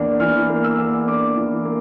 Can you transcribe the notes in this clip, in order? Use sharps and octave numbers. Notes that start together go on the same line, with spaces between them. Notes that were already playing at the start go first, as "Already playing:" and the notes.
Already playing: E2 A#3 D4
E3 F6
A#3
E6
E2
D4 D6
E3
A#3